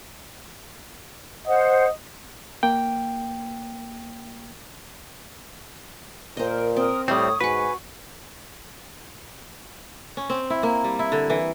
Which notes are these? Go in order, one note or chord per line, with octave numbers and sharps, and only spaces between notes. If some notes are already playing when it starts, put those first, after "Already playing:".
C5 D#5 F#5
A#3 G5
A#2 A#4 C5 D#5
C4 A#4 D#6
A2 G3 A3 C4 C#5 D#6
G#2 F#4 B4 G#5 C#6
C#4
C4
E4
A#3
G3
E4
D3
E3